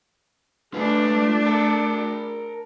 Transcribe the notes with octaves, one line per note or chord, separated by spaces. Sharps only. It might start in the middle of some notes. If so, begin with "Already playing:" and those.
A3 D4 F4 B4
A#4 A5